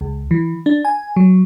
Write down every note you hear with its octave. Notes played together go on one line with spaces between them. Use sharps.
C#2
E3
D4
G#5
F#3